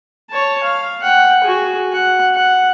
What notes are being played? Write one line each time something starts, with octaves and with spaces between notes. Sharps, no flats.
C#5 A5
F5
F#5 G5
F#4 G#4
F#5
F#5